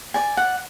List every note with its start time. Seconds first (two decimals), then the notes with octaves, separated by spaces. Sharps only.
0.14 D5 G#5
0.37 F#5